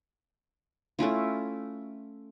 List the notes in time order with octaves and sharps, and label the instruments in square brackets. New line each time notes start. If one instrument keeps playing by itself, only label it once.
[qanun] A3 C#4 E4 F4